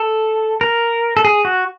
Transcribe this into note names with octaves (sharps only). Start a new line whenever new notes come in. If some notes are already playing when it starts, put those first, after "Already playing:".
Already playing: A4
A#4
A4
G#4
F#4